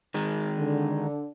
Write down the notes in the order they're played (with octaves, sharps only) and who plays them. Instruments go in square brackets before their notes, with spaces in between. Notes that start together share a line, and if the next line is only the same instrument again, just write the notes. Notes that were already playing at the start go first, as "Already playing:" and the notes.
[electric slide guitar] D#3 G#3
[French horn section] D3